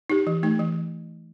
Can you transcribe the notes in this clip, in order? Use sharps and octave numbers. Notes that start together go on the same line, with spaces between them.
D#4 G4
E3
A3 D#4
E3